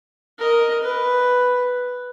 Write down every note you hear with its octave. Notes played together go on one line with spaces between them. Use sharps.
A#4 D#5
B4